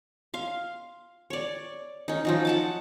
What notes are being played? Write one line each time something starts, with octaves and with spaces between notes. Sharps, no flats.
F5 C6
C#5 D5
C#4 D#4
F3 F#3 D#4
F#5 A5 D6